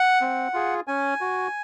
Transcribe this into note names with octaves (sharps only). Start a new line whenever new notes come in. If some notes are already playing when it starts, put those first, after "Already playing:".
Already playing: F#5
C4
F4 G#4
C#4 G#5
F#4